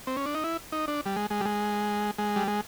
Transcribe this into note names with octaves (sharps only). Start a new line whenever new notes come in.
C4
C#4
D4
D#4
E4
D#4
D4
G3
G#3
G#3
G3
G#3
G#3
G3
G#3